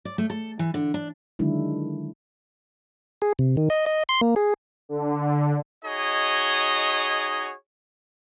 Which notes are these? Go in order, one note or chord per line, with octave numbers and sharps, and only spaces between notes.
D5
A3
A4
E3
D3
D4
D3 D#3 F#3 G#3 D4 E4
G#4
C3
D#3
D#5
D#5
C6
A#3
G#4
D3
D#4 F#4 G#4 C#5 D#5